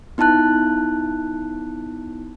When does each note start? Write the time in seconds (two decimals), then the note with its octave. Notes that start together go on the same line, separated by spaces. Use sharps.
0.18 B3 D#4 E4 A5 F#6